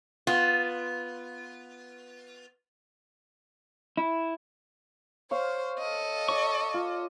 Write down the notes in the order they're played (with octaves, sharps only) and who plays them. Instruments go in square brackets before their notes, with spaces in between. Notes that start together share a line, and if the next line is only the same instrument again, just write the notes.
[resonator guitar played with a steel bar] B3 F4
[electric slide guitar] E4
[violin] C5 [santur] C#5 F5
[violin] A4 D#5
[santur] C#5 D5 [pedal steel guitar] C#6
[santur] F4